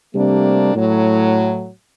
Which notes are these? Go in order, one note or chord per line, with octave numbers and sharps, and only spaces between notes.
C3 G3 A3 A#3 C4 D4
A2 F#3